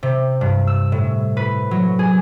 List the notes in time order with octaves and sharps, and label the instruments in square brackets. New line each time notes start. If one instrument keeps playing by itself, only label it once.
[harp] C3
G2
E6
A2
B4
F#3
G#4